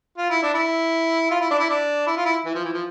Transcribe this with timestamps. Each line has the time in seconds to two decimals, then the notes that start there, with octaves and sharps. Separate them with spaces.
0.18 F4
0.30 E4
0.43 D4
0.54 E4
1.31 F4
1.41 E4
1.51 D4
1.59 E4
1.70 D4
2.07 E4
2.17 F4
2.26 E4
2.45 E3
2.55 F3
2.65 E3
2.73 F3